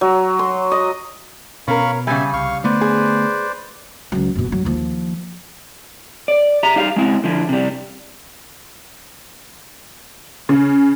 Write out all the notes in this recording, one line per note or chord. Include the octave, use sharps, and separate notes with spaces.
F#3
C6
D#5
B2 C#4 A#4 F5 B5 C#6
C#3 G3 E5 G#5
C2 F5 C#6
D3 A3 B3 B4 C5 D5
G#4
C#2 F#3
F#1 B2
F#3
D#2 F3
D5
G4 E5 A#5
G3 D#4 G4 F5
G#3 C4 E4
D3 F3 E4
C3 G3
C#3